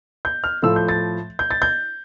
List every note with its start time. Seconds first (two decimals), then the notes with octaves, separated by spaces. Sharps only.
0.25 G6
0.44 F6
0.62 A2 F3 A3 E6
0.76 G6
0.89 A6
1.39 G6
1.51 A6
1.62 G6